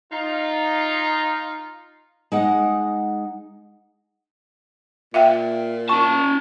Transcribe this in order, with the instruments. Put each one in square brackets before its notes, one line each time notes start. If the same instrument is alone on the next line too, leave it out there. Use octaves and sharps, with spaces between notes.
[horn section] D#4 F4
[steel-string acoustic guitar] G#3 D#4 F#5
[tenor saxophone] A#2 [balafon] E5 F5 G5
[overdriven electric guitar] C#4 A5 [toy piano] C#6